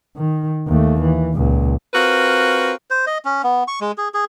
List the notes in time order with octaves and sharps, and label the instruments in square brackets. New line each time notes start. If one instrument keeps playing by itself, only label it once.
[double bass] D#3
D#2 A3
E3
C#2 A#2
[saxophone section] C4 F4 F#4 A#4 B4
[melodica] C5
D#5
C#4
B3
C#6
G#3
G#4
G#4